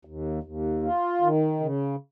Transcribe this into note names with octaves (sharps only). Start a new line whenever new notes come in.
D#2
D#2
F4
D#3
C#3